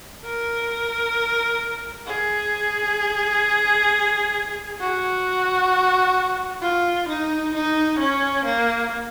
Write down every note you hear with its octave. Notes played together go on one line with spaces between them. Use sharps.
A#4
G#4
F#4
F4
D#4
D#4
C#4
A#3